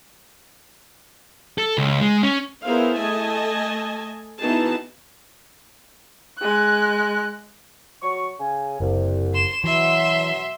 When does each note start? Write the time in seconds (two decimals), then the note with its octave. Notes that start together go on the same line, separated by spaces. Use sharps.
1.58 A4
1.78 C#2
2.01 G#3
2.23 C#4
2.63 B3 E4 G#4 A#4 C5 F5
2.97 A3 D#5 G#5 A5
4.40 E3 B3 D#4 F#4 G#4 A5
6.38 G#3 F#6
8.02 F#3 C#6
8.40 C#3 G#5
8.80 F#1 C2
9.34 C6 E7
9.64 B2 E3 F#3 E5 C6